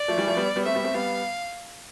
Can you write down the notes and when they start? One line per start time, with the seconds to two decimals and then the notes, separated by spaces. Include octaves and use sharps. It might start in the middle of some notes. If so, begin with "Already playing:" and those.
Already playing: D5
0.08 F3 A3
0.17 E3 G3
0.27 F3 A3
0.37 G3 B3
0.56 G3 B3
0.65 A3 C4 E5
0.75 G3 B3
0.84 A3 C4
0.94 G3 B3 F5